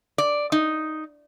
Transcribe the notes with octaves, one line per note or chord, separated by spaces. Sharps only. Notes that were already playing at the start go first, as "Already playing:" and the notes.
D5
D#4